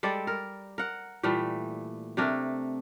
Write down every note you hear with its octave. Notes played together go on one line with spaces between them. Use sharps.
G3 G#3 A4 D5
A#4
A#4 F#5
A#2 E3 G3 A3
C3 A3 D4 A#4